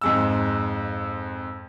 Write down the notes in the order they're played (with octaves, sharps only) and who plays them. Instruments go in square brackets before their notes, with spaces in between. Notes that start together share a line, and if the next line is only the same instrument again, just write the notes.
[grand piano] F2 G#2 E6